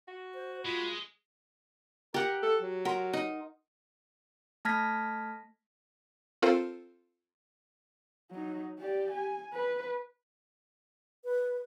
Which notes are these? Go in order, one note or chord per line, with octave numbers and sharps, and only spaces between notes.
F#4
C5
G#3 F4 B5
G4 A#4 F#5
A4
F#3
A#4 F#5 A#5 C6
D#4
A3 A5 F6 G#6 A#6 B6
C4 F4 A4 A#4 C5
F#3 D#4
G4 D5
G#5
B4
B4